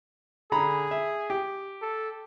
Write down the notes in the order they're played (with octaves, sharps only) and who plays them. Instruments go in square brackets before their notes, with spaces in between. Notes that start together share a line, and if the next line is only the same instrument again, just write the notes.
[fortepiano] D3 A#5 B5 [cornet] G#4
[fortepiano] E5
G4
[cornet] A4